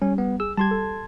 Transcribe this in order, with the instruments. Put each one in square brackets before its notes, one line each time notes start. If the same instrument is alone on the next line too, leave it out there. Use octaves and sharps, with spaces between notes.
[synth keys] G3 [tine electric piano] C#4
[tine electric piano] B3
[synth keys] G#4 [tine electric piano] E6
[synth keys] G3 G4 [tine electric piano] A5 C6 G#6
[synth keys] A4